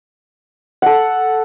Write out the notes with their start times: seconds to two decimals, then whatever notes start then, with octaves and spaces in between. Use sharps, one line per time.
0.82 A4 F#5